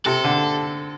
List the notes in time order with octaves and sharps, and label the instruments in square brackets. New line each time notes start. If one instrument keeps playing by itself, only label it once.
[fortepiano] C3 [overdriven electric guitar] A4
[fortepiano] D3